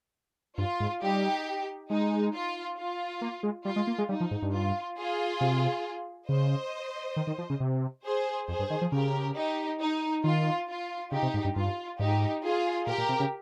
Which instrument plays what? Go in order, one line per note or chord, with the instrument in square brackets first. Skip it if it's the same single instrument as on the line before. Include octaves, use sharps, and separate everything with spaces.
[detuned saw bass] G2 [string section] F4
[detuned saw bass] G#2
[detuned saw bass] G3 [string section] D#4 G4
[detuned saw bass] G#3 [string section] D#4
[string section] F4
F4
[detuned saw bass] A#3
G#3
[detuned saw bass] G3 [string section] F4
[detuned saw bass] G#3
A#3
G#3
[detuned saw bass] G3 [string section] D#4
[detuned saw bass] F3
G#2
G2
[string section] F4
F4 G#4
[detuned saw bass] C3
[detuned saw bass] C#3 [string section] C5 D#5
[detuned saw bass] D#3
D#3
F3
C#3
C3
[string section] G#4 C5
[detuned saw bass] F2 [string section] G#4 C5
[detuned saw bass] G2
D#3
F3
[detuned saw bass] C#3 [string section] G4 A#4
[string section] D#4 G4
D#4
[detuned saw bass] D#3 [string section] F4
[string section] F4
[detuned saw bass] C#3 [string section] D#4 G4
[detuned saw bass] C3
G#2
G2
[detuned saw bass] G2 [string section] F4
[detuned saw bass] G#2 [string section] D#4 G4
[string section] F4 G#4
[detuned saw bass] A#2 [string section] G4 A#4
[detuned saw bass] A#2
C3
C#3